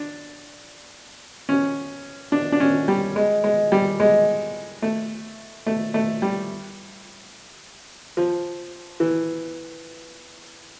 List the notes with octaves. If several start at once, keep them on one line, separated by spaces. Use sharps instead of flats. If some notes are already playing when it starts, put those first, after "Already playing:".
Already playing: D4
C#4
D4
D4
C#4
G3
G#3
G#3
G3
G#3
A3
A3
A3
G3
F3
E3